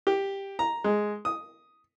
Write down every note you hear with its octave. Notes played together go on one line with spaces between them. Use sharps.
G4
A#5
G#3
D#6